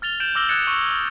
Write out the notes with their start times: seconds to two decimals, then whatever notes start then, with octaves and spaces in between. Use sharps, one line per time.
0.02 F6 A6 F7 G7
0.20 G6 D7 E7 F#7
0.35 D6 E6 F6 A#6 F#7 G7
0.49 D#6 F#6 G#6 A6 C#7 E7
0.67 C#6
0.87 D#6 G7